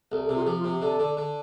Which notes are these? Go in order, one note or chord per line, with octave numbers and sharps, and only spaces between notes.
C2 A4
A4
C3
F4
A4
F3 G4
F4
C3
G4
D3 A4
D3
D3